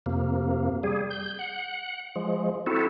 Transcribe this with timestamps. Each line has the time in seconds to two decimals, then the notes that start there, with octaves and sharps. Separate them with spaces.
0.06 F2 C3 A#3
0.83 G3 G#4
1.10 G6
1.39 F#5
2.16 F3 G#3
2.66 C4 E4 F#4 A4